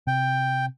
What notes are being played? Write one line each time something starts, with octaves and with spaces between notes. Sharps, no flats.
C3 G5